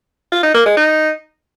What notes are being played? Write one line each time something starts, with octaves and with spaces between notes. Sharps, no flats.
F4
D#4
A#3
G#3
D#4